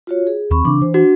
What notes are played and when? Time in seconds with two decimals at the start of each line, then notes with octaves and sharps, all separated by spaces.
0.07 F4 F#4 C#5
0.27 G#4
0.51 D#2 C4 B5 C#6
0.65 C#3 E3 D4 D6
0.82 E3 C5
0.94 D4 F#4